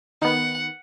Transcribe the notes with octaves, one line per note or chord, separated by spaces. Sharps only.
D#3 B3 F#5